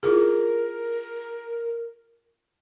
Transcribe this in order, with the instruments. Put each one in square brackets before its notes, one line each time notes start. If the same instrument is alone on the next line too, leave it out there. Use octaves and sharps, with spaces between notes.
[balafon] E4 F4 G#4 [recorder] A#4